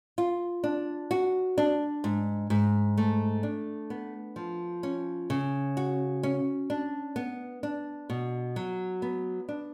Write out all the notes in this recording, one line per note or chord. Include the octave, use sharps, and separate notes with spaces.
F4
D4
F#4
D4
G#2
G#2
A3
D4
B3
F3
C#4
C#3
F#4
C#4
D4
B3
D4
B2
F#3
B3
D4